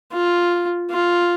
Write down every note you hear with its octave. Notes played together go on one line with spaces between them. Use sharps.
F4
F4